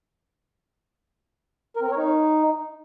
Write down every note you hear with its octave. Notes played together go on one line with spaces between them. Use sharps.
A#4
C4
A#4
C#5
D#4